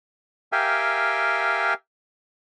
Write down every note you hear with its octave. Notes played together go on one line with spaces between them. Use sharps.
G4 A#4 E5 F5 G5 G#5